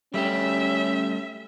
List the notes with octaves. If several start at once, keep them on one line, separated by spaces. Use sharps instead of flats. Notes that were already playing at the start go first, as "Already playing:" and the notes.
G3 A3 C#4 G4 E5